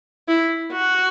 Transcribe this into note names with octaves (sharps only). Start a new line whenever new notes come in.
E4
F#4